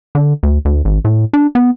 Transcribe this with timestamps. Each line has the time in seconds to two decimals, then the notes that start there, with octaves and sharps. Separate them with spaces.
0.15 D3
0.43 D2
0.65 D2
0.85 G#1
1.05 A2
1.33 D4
1.55 B3